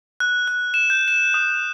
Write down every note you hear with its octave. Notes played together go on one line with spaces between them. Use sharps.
F#6
F#6
E7
G6
E7
D#6